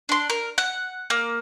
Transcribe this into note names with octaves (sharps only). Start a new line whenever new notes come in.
D4 C6
A#4
F#5
A#3